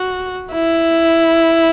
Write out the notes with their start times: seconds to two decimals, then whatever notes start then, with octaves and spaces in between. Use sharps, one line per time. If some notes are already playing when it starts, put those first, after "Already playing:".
Already playing: F#4
0.52 E4